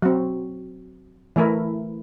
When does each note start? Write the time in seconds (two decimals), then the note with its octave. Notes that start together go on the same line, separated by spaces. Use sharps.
0.02 F#3 C4
1.36 E3 A3 E4 A#4